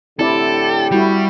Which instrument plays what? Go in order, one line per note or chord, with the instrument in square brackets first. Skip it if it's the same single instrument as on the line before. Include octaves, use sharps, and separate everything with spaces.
[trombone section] A2 D3 G4 [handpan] C4 E4 D5 [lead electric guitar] A4
[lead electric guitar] G3 [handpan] E4 F#4